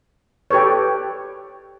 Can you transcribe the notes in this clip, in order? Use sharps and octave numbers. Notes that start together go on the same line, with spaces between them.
G4 A4 B4 C#5